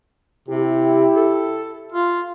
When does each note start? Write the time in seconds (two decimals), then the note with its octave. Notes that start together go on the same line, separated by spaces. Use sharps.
0.48 C3 E4 G4
1.16 A4
1.92 F4